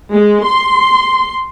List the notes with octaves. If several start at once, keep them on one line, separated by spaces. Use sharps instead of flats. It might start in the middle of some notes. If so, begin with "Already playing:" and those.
G#3
C6